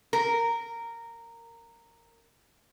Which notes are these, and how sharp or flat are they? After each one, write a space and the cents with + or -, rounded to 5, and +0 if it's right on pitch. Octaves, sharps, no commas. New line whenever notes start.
A#4 -10